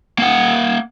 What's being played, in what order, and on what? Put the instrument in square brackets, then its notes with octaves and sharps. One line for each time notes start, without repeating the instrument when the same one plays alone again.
[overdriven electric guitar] A#3 F#5